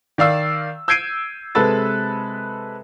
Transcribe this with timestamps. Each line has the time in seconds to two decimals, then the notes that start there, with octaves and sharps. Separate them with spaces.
0.18 D#3 D5 F5 E6
0.88 E6 G6 G#6 C7 D7 D#7
1.55 C3 G#3 A4 B4 E6 A6